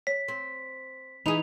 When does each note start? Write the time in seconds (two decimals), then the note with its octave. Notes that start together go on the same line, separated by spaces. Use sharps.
0.07 C#5 B6
0.28 C4
1.26 E3 D#4 E4 G#4 B5 F7